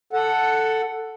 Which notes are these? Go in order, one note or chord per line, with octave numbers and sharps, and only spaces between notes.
A4 F#5